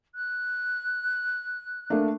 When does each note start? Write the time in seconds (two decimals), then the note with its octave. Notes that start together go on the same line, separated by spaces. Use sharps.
0.15 F#6
1.90 A3 A#3 D4